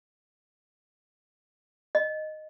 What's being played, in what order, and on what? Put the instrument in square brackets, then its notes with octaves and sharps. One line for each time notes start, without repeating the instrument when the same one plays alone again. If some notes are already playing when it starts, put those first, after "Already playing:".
[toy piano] D#5